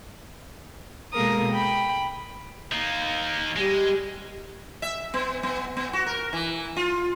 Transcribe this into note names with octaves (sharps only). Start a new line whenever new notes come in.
B2 G#3 A#3 A4 A#4 D#6
G5 B5
D#3 A#3
G3 G#3
E5
B3
B3
B3
F#4
A#4
E3
F4